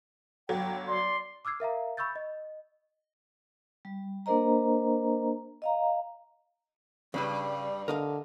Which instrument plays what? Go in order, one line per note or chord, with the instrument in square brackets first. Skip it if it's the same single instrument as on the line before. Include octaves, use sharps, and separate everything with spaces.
[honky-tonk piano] G1 F#3 [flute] G5
[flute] D5 [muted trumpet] C6
[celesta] D6 E6 F6 G#6 C7
A#4 E5 F5 A#5
B5 C#6 E6 G6 A6
D#5
[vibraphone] G3
A#3 D4 A#4 C5 D#5 A#5
D#5 F5 A#5
[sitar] G2 [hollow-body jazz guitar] C#3 D4 B4 [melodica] G3
[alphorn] D3 [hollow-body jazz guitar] A#4 D#5 F5